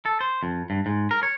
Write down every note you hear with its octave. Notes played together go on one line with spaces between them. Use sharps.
A4
C5
F2
G2
G#2
A#4
C#5